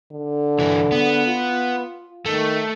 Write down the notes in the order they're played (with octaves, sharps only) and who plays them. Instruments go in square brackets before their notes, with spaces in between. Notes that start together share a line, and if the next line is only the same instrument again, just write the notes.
[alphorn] D3
[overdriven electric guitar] C2 E3
B3
[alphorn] F4
[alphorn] D#3 [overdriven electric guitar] A3